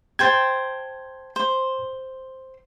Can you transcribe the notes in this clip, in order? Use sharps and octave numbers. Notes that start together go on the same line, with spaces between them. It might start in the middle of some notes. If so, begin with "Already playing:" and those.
C5 G5 A5 G#6
C5